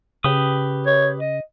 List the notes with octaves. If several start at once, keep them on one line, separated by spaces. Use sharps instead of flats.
C#3 G4 B4 D#6
C#5
D#5